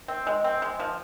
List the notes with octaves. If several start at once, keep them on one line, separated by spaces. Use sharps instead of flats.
C4
G#3
C4
G#3
F3